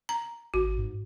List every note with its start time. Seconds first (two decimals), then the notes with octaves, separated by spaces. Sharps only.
0.09 A#5
0.54 G#1 F#4
0.78 G#2